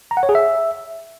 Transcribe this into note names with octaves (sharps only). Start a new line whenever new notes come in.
A#5
F#5
C#5
G#4
E5